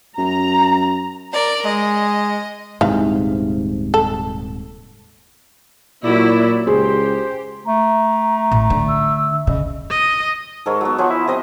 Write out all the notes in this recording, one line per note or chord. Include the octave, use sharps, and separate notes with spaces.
F#2 A#5
A#4 D5
G#3 D#5
D#1 G#2 C3 E3 F5
A4
A#2 F#3 E4 F#4 D5
C#2 G4 G#4 C5
A3 A#5
A1
D3
E6
C#3 D#5
D#5
G#2 A4 A#4 C#5
F#3 B3
F3 F#3 G#5
E4
C3 B4 D#5 D#6